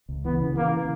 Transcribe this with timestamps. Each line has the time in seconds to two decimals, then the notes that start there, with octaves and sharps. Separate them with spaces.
0.09 C#2
0.25 E3 B3
0.41 C#3
0.57 E3 A#3